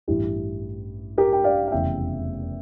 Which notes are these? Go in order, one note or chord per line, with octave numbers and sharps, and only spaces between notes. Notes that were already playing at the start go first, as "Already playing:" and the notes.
A1 G2 E3 E4 G4
G4 A#4
G5
D5 F5
F5
F1 E2 C#3 E3 E5 G5